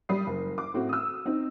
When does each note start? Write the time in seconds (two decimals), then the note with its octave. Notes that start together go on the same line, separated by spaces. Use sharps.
0.09 G3 B5 D#6 C7
0.27 F#1
0.58 D6
0.74 A2 C4 F#4
0.89 D#6 E6
1.26 C4 D#4